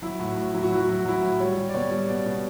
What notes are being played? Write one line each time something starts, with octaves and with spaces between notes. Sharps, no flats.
F#3 E4
A2 F#4
A2
F#3 E4
F#4
F#3 E4
F#4
F#3 E4
F#4
F#3 E4
A2
G3 C#5
G3
D5
B2 C#5
G3
B2 D5
B2